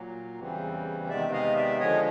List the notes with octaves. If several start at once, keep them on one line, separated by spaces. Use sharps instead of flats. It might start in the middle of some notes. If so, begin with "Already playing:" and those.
Already playing: A#2 F#3 A#3
E2 C#3 E3 G3 C4
C3 D#3 G#3 B3 D5 E5
D#5 F5
D5 E5
D3 F3 G#3 C#5 D#5